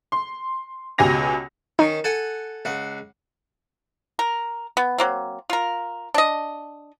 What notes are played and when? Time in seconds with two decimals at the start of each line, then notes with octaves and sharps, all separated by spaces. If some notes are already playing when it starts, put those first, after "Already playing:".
0.12 C6
0.98 C#2 B2 G4 G#5 A#6 F7
1.79 D#3 C#4 D#4
2.04 A4 F#5 G#5
2.65 C#2 F#5
4.19 A#4
4.77 B3
4.98 F#3 A#3 C4
5.50 F4 A#4
6.14 D4 D#5